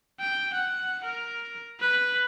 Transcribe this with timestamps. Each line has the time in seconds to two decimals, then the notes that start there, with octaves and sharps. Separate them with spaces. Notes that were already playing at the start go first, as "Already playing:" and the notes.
0.20 G5
0.53 F#5
1.04 A#4
1.80 B4